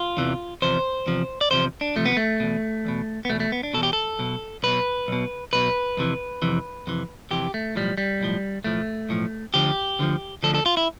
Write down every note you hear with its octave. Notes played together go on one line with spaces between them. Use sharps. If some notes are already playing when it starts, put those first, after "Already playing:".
Already playing: F4
E2 C3 E3
E2 C3 F3 C5
E2 C3 F3
D5
E2 C3 F3 C5
D4
E2 C3 F3 A3
B3
A3
E2 B2
E2 B2
B3
E2 B2 A3
A3
B3
D4
E2 B2 A4
G4
A4
B1 B2
B1 B2 B4
B1 B2
B1 B2 B4
F2 C3 E3
F2 C3 E3
F2 C3 E3
F2 C3 E3 G4
A3
B1 A2 F3 G3
G3
B1 A2 F3
B1 A2 F3 A3
B1 A2 F3
D2 D3 F3 G4
D2 D3 F3
D2 D3 F3 A4
A4
F4
E4